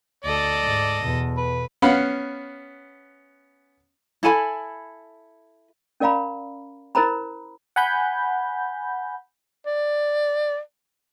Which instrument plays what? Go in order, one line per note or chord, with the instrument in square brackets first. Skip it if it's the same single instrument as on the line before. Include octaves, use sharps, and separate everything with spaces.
[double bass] D2 [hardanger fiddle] A4 D#5 [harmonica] D5
[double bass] G#2
E2 B2
[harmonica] B4
[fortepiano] B3 C#4 F5 F#5 B5
[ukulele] E4 A4 G#5 B5
[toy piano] C#4 A#4 D5 F5 A#5 B5
E4 A#4 C5 A#5 B5
[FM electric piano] F#5 G#5 B5 G6
[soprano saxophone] D5